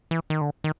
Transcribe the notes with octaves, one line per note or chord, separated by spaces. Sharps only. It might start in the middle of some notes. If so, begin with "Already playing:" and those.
E3
D#3
D3
D#3